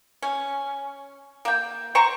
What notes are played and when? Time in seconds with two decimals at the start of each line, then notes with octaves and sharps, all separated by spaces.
0.22 C#4
1.45 A#3 G5
1.95 C5 G5 A#5 C#6